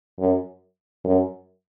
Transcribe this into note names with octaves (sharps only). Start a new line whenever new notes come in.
F#2
F#2